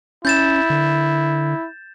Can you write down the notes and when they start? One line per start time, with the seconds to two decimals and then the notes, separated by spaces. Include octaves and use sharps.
0.25 C#4 E4 G6 A6 E7
0.70 D3